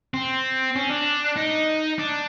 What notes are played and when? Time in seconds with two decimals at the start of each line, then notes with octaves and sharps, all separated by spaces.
0.14 C4
0.76 C#4
0.90 D4
1.37 D#4
1.98 D4